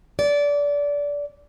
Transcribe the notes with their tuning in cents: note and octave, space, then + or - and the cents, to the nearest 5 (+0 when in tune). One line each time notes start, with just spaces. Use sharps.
D5 -20